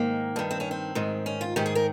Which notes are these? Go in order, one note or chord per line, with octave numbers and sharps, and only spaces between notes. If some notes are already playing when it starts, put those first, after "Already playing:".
Already playing: G#2 D#3 A#3
G2 D#3
C4
C#4
C4
G#2 D#3
C#4
F4
G#2 D#3 G4
G#4
A#4